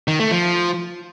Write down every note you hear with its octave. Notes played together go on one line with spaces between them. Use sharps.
D#3
A3
F3